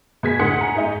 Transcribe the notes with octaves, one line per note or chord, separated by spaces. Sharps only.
B2 G#4 G#6 B6
D2 A2 F#5 C6 D#6 C#7
G#5 A#5
G#2 D#4